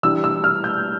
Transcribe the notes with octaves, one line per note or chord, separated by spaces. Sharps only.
E3 G3 D4 E6
E6
F6
G6